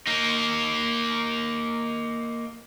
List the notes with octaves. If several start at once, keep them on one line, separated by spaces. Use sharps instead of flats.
A#3 D#4